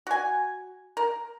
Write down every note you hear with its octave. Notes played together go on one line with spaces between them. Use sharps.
F#4 G#5
A#4